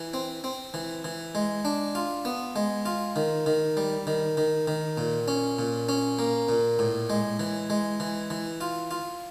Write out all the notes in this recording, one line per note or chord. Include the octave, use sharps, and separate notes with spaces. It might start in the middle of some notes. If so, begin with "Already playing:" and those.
Already playing: E3
C4
C4
E3
E3
G#3
D4
F4
B3
G#3
F4
D#3
D#3
G3
D#3
D#3
D#3
A#2
C#4
A#2
C#4
A#3
A#2
A2
G#3
E3
G#3
E3
E3
F4
F4